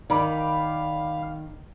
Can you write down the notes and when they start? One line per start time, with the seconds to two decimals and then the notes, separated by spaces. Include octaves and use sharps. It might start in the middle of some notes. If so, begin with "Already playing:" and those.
0.10 D#3 D5 F5 B5 D6